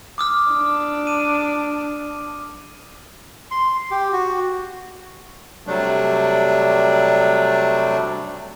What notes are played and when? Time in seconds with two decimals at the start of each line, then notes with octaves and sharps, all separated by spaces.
0.18 D6 D#6 F6
0.51 D4
1.07 D#7
3.51 C6
3.91 G4
4.13 F#4
5.67 C3 F#3 G3 A3 D4